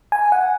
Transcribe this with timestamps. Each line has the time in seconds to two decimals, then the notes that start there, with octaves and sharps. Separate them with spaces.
0.12 G#5
0.32 F#5